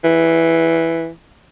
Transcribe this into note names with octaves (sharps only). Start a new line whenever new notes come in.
E3